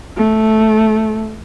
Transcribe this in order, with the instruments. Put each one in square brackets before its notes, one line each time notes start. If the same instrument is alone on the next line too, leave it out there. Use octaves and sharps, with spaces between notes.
[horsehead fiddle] A3